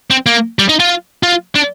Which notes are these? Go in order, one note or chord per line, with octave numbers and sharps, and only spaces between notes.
C4
A#3
G3
D#4
F4
F4
D4